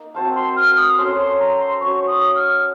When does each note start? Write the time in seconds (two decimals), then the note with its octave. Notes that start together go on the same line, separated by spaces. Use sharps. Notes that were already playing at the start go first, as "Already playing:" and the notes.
Already playing: A#3 D#4
0.15 C4 F#4 C5 F5 A5
0.35 C6
0.56 F6
0.77 D#6
0.97 C#4 F#4 A4 C5 C6
1.18 C6
1.39 A#5
1.59 C6
1.80 C#4 F#4 C5 C#6
2.07 D#6
2.36 F6